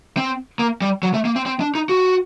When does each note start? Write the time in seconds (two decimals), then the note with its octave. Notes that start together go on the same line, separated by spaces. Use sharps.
0.17 C4
0.59 A#3
0.82 G3
1.03 F#3
1.14 A3
1.25 A#3
1.36 C4
1.46 C4
1.60 D4
1.75 D#4
1.89 F#4